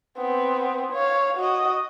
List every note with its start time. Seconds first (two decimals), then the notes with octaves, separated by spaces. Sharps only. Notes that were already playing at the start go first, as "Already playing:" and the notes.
0.18 B3 C4
0.92 C#5 F5
1.37 F#4 D#5